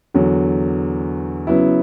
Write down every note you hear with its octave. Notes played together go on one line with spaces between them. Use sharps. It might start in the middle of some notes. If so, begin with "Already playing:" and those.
E2 D3 F#3
C#3 F#3 B3 E4